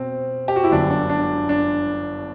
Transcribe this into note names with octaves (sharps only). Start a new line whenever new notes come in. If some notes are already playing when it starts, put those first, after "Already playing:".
Already playing: B2 C4
G4
F#4
E4
G1 F#2 D3 D4
D4
D4
D4